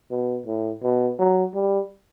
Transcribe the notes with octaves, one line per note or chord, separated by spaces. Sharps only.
B2
A2
B2
F#3
G3